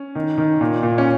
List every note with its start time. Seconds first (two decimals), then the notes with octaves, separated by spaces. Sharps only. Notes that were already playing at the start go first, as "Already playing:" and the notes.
Already playing: C#4
0.15 D#3
0.38 D#3
0.61 A#2
0.83 A#2
0.98 C#4